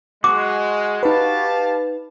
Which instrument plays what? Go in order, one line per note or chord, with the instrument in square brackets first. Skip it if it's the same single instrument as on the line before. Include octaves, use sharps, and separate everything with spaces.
[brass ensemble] G#3 [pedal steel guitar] F#4 [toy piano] D6
[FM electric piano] D#4 B4 [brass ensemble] G4 F5 A5